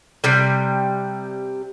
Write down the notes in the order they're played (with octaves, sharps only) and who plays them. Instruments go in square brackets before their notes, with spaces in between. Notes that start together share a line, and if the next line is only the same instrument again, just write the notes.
[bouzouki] C3 G3